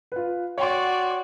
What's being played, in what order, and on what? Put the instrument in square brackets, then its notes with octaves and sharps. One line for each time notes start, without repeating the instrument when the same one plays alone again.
[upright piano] F4 B4
[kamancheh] F#4 D5 [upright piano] C#5 G5 C6